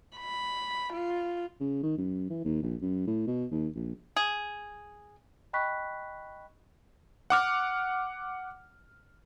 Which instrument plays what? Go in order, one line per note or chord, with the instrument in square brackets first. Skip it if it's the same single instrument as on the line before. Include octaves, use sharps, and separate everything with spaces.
[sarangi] B5
F4
[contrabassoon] C#3
D#3
F#2
E3
D#2
A#1
F#2
A2
B2
D#2
A#1
[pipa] G#4
[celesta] D#5 G5 B5 C#6 F#6 B6
[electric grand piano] F#5 D6 F6